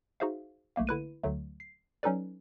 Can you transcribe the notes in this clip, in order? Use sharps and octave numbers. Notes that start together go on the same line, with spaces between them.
D#4 F#4 G#4 C5 E5 F5
B1 A3 A#3 F5
D3 E4 B4 D#7
D2 D3 F#3 A3
C7
F#3 C#4 D#4 A4 B4 D5